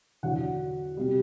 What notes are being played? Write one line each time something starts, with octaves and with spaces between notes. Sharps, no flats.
E2 D3 F#3 F#5
C3 G3